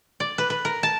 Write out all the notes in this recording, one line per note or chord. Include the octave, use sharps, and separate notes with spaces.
D5
B4
B4
A#4
A5